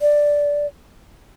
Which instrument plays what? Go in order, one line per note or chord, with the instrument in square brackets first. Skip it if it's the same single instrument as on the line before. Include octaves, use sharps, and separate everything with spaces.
[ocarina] D5